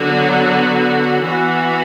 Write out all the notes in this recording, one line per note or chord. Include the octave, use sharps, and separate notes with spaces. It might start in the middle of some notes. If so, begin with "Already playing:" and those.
Already playing: D3 F#3 B3 F#4
E3 B3 F#4